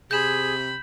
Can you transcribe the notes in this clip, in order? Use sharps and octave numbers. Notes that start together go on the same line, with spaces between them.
C3 G#4 B5 G6 E7